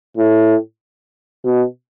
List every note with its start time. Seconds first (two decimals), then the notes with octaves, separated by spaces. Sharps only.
0.17 A2
1.45 B2